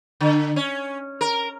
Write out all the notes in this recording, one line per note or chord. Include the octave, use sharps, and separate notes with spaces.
D3
C#4
A#4